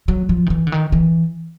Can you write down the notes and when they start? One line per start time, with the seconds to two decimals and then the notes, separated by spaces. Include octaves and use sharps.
0.08 F#3
0.29 F3
0.46 D#3
0.50 E3
0.67 D3
0.72 D#3
0.92 E3